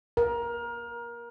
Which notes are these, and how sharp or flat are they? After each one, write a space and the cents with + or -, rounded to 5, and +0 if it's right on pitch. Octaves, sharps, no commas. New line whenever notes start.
A#4 +20